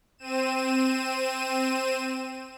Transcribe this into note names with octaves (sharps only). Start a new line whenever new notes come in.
C4 D#7 E7